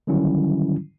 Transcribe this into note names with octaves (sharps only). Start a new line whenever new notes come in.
D3 D#3 F#3 G3 C#4 E4